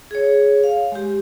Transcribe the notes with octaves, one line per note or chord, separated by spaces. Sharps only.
G#4 C#5
F5
G#3 G4